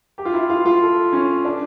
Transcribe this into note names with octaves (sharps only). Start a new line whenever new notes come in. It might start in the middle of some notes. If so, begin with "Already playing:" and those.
G4
F4
E4
F4
F4
A4
C#4
D4